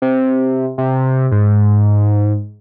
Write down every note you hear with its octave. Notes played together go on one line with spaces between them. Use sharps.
C3
C3
G#2